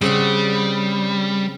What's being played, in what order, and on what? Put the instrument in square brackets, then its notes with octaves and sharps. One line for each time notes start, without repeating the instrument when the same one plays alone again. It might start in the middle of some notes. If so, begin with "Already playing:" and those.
[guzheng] C#3 C4 F#5 [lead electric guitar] G3